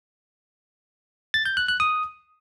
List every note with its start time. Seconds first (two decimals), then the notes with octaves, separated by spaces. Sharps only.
1.34 A6
1.46 G6
1.57 F#6
1.68 F#6
1.80 D#6